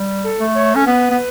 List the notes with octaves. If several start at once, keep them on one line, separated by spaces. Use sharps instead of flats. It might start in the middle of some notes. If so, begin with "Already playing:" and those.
Already playing: G3
A4
A3
C#5
C#4 A4
B3 B4
B3